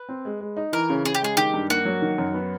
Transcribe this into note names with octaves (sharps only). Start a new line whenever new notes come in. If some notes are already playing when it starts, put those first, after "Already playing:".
Already playing: B4
C4
G#3
G#3
D#4
E3 A#4
C#3
C#3 G#4
G4
G#3 G#4
D#3 G4
G2
A#3 F#4
F#3
D#3
F#2
B3